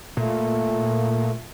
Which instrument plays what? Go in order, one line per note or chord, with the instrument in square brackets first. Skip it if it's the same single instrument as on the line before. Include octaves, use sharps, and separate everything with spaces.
[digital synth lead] A#2 [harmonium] A3